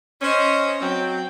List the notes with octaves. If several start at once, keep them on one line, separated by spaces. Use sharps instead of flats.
C#4 C5 D#5
F#3 C4 G5